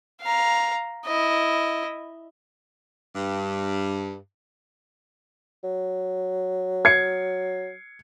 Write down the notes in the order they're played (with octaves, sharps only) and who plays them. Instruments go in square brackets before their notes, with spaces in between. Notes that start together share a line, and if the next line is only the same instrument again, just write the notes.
[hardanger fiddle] F5 A#5
E4 D#5
[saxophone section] G2
[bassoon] F#3
[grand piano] G#6 C7 C#7